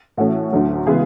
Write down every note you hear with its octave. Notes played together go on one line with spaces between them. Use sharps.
A2 E3 A3 C#4 F#4
D2 D3 F#3 A3
C#3 E3 G#3 B3 G#4